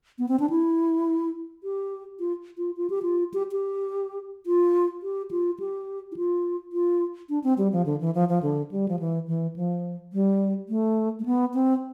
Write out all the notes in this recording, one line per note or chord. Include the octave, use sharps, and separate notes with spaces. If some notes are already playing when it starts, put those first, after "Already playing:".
B3
C4
D4
E4
G4
F4
F4
F4
G4
F4
G4
G4
F4
G4
F4
G4
E4
F4
F4
D4
C4
G3
F3
D3
E3
F3
F3
D3
G3
F3
E3
E3
F3
G3
A3
A3
B3
C4